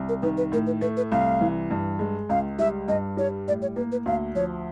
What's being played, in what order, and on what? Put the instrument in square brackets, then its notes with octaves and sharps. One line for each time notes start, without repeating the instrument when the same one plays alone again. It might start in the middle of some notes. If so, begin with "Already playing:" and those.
Already playing: [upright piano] C2
[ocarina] A#4
[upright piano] D#3 [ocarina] B4
[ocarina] B4
[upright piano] A2 [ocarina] A#4
[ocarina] B4
[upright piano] A3 [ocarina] B4
[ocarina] B4
[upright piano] C2 [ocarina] F5
[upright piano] E3
G2
G#3
[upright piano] C#2 [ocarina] F5
[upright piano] G3 [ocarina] E5
[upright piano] G2 [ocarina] D#5
[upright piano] G3 [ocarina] C#5
[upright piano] A2 [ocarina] D5
[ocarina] C#5
[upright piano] A#3 [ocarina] B4
[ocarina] B4
[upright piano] D2 [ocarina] F5
[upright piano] F3 [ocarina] C#5